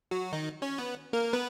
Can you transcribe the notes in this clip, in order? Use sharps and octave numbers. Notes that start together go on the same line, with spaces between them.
F#3 F#4
D#3 D#4
C#4 C#5
B3 B4
A#3 A#4
B3 B4